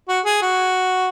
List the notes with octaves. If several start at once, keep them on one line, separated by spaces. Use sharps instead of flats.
F#4
G#4
F#4